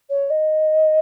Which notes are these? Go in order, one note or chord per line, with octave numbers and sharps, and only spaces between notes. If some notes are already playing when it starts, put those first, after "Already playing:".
C#5
D#5